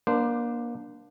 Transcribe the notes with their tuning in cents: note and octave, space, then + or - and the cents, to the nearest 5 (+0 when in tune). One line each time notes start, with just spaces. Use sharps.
A#3 +25 D4 +0 C5 -20